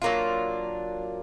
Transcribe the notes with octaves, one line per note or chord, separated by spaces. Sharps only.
F#3 A#3 D4 F4